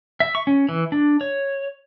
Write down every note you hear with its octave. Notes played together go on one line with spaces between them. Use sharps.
E5
C#6
C#4
E3
D4
C#5